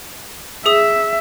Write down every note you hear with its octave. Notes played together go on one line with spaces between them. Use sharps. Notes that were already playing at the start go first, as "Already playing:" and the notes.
G#4 E5 D#6